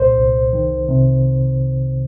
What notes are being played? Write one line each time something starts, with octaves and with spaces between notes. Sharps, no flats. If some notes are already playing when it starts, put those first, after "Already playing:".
Already playing: C2 A#2 G3 C5
C2
D#3
C3